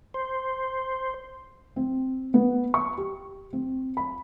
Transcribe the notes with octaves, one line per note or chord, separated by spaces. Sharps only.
C5
C4
B3
C#6
G4
C4
B5